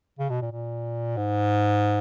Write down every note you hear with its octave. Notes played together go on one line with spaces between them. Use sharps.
C#3
B2
A#2
A#2
G#2